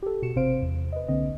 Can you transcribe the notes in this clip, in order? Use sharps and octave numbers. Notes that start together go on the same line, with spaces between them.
G4 A4
B2 F#4 C#7 E7
G#1 C3 C4 C5 F5 D7
E2
B4 D#5
C2 D3 A#3 C4 D#5